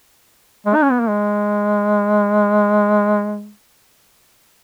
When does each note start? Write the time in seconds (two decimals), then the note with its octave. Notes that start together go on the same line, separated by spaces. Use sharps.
0.66 G#3
0.75 D#4
0.82 C#4
0.91 B3
1.00 A#3
1.09 G#3